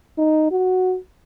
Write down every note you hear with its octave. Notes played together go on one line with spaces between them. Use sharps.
D#4
F#4